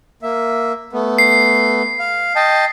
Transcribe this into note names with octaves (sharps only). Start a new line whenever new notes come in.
A#3 E5
A3 B3
C7
F5
D#5 G5 A5